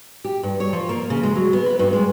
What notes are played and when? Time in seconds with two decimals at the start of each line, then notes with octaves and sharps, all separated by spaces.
0.24 G4
0.43 G2
0.60 C#5
0.73 F3
0.89 A#3
1.10 C#3
1.23 G#3
1.36 F#3
1.53 B3
1.66 B4
1.79 G2
1.93 G#3